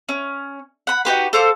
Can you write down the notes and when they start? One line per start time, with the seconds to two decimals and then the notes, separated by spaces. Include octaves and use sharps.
0.09 C#4
0.87 F#5 B5
1.05 D#4 F#4 G4 B4
1.33 A4 C5 F5 D6